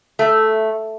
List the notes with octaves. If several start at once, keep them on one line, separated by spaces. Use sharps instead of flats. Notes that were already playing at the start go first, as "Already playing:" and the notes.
A3